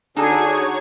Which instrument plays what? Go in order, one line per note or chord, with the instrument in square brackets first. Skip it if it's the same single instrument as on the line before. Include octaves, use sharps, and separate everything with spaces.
[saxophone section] D3 [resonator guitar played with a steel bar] D#4 A5 [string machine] F#4 C#5 G#6 [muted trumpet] G#4